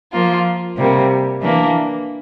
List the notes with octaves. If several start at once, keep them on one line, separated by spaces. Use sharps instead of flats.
F3 A#3 F4
C3 G3 A#3
E3 A#3 D4